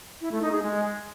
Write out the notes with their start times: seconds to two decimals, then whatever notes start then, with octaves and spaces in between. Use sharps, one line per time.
0.21 E4
0.31 A3
0.42 D#4
0.52 G#4
0.62 G#3